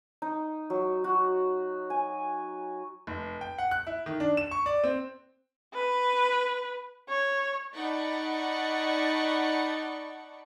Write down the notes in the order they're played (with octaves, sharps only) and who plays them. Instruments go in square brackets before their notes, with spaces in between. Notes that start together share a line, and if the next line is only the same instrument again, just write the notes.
[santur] D#4
F#3
F#4
G#5
[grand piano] F1
G5
F#5
F#6
E4
D#3
D4
E7
C#6
D5
C4
[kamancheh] B4
C#5
[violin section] D#4 D5 F#5 A5 B5 C#6